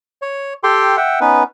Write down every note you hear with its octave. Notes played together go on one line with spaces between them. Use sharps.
C#5
G4 A4 G5 C6
E5 F#5 G5
B3 C#4 D#4 B4